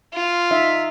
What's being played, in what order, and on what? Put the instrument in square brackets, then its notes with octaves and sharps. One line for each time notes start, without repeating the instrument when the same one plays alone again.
[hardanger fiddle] F4
[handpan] D#4 E5